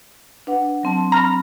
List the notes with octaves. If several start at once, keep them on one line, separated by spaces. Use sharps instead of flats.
D4 B4 F#5
F#3 C4 A5
A#5 B5 F6